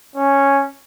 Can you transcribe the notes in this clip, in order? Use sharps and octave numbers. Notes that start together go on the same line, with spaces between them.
C#4